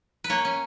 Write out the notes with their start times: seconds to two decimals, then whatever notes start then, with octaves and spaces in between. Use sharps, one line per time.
0.24 B4
0.30 A#3 C#5
0.45 C#4